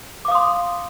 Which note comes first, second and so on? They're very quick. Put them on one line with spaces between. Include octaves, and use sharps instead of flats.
D6 F5 D#6 C6